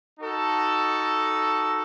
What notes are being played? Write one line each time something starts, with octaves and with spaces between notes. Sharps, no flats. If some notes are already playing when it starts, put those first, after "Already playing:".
D#4 F#4 A4